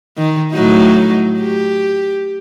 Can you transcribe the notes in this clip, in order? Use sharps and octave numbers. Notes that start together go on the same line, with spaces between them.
D#3
A2 F#3 D#4
G4